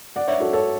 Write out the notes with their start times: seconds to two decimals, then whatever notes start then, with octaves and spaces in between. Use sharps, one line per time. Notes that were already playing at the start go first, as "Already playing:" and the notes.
0.16 D5 F#5
0.28 C#5 E5
0.40 F#4 A4
0.53 A4 C#5